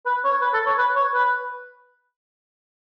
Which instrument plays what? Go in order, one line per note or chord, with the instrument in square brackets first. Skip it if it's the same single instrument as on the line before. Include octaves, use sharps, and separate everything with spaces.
[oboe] B4
C#5
B4
A4
C#5
B4
C#5
B4